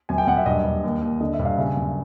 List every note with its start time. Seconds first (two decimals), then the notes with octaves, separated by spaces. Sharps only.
0.09 F#2 G#5
0.18 G5
0.27 F#2 F#5
0.37 E5
0.46 G2 D#5
0.64 G2
0.84 D#2
1.02 D#2
1.20 D3 D#5
1.34 E5
1.39 G2
1.45 F5
1.58 C#3 E5
1.77 F#2